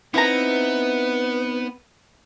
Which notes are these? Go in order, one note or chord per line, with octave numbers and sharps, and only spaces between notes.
B3 C4 D#4 E4 B4 A#5